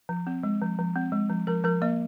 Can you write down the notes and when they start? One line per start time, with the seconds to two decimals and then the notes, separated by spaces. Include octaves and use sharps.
0.09 F3
0.27 C4
0.43 G#3
0.62 F3
0.79 F3
0.96 C4
1.12 G#3
1.30 F3
1.47 F3 A#4
1.64 F3 A#4
1.82 A#3 D#5